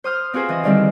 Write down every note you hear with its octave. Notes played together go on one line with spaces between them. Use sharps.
C5 D#6 F6 G6
C4 F4 F#4 G#4 B4 C5
E3 D#5
D3 D#3 G3 C4 E4